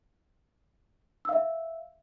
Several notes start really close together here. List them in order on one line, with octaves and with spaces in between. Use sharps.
E6 F5 E5